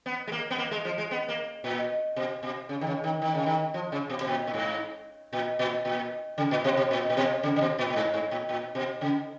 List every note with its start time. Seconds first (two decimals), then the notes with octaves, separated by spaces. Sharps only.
0.06 B3
0.27 G#3
0.32 A#3
0.51 B3
0.58 A#3
0.71 G#3
0.85 F3
0.98 G#3
1.11 B3
1.29 A#3
1.64 A#2
2.16 B2
2.43 B2
2.69 C#3
2.81 D#3
2.87 C#3
3.04 D#3
3.22 D#3
3.34 C#3
3.46 D#3
3.74 F3
3.92 C#3
4.10 B2
4.21 B2
4.27 A#2
4.47 A#2
4.54 G#2
5.33 A#2
5.59 A#2
5.85 A#2
6.38 C#3
6.51 A#2
6.64 B2
6.77 B2
6.91 A#2
7.10 A#2
7.17 B2
7.43 C#3
7.56 C#3
7.61 B2
7.79 A#2
7.90 A#2
7.96 G#2
8.14 G#2
8.31 A#2
8.49 A#2
8.75 B2
9.01 C#3